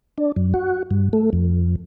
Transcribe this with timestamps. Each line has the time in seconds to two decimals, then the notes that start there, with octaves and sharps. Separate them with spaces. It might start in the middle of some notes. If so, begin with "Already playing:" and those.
0.18 D4
0.36 F#2
0.54 F#4
0.91 G2
1.13 A3
1.33 F2